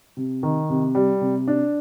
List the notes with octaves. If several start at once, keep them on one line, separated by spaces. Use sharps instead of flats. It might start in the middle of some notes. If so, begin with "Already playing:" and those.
C3
D#3
C3
G3
C3
D4